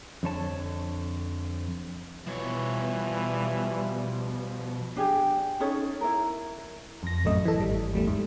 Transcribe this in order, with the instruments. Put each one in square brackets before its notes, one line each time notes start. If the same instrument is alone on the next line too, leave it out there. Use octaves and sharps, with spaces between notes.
[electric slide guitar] F2 D3 C#5 A5
[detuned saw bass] B2 [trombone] E3 [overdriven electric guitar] F3 C#5 [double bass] G3
[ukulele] D4 G4 G#4
C#4 D#4 A4 C#5
E4 A#4
[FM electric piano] F2 A#6
A1 F#2 A3 D#5
E3 A4
G#1 G3
E2 G3 A3
G#2